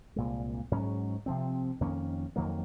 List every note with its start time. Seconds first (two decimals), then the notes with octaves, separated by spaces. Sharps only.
0.16 C2 A#2 G#3
0.71 G#2 F#3 C#4
1.26 C3 F3 C4
1.81 F2 D#3 A#3 C#4
2.36 F2 D#3 F#3 A#3